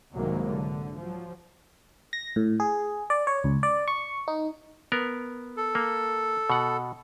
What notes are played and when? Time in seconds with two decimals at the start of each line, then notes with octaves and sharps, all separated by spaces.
0.15 C2 G#2 C3 D#3 F#3 A#3
0.48 D3
0.99 F3 F#3
2.13 A#6
2.36 A2
2.60 G#4
3.10 D5
3.27 C#5
3.44 C#2
3.63 D5
3.88 C#6
4.28 D#4
4.92 B3 A#4
5.57 A4
5.75 A#3
6.50 B2 F#5